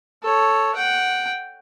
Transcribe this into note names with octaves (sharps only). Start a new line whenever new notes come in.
A4 C#5
F#5 G5